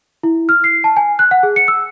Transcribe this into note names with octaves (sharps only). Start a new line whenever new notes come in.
E4
F6
C7
A5
G#5
F#6
F#5
G#4
C#7
E6